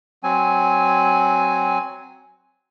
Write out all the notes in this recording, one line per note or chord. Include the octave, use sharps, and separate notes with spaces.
F#3 C4 G#5